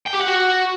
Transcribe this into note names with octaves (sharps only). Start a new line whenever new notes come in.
G5
G4
F#5
F#4